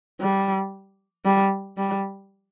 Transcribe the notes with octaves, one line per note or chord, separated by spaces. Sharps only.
G3
G3
G3